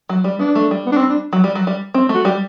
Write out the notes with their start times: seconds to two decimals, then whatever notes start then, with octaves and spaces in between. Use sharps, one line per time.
0.09 F#3
0.24 G3
0.39 B3 D4
0.55 A3
0.71 G3
0.86 B3
0.92 D4
0.97 C4
1.09 D4
1.33 F#3
1.44 G3
1.55 F#3
1.67 G3
1.94 C4
2.09 A3
2.14 F#4
2.25 G3 G4